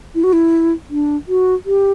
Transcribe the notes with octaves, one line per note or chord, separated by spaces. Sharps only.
E4
F#4
E4
D4
F#4
G4